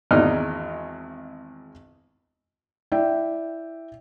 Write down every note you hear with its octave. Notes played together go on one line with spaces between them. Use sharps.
G#1 E2 G#3 D4 D#4 F6
E4 D5 E5 G5